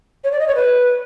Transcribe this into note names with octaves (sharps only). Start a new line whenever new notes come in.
C#5
D5
D#5
C#5
B4